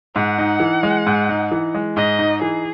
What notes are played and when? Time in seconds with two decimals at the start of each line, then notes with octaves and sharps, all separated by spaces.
0.16 G#2 F#5
0.38 D#4
0.60 E3
0.83 G#3
1.06 G#2
1.29 D#4
1.51 E3
1.75 G#3
1.96 G#2 D#5
2.19 D#4
2.42 E3 G#4